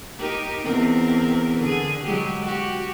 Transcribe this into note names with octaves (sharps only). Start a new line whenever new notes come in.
D#4 G4 A#4
E2 C4 A#4
D3 G#4
F#3 G#3 G4
F#4 G4